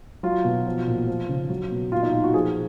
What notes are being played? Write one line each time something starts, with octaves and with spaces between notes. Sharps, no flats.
F#3 F4
B2
F3
A#2
F3
C#3
F#3
B2
A#2 F4
D#4
A#2 F4
F#4
F3 G#4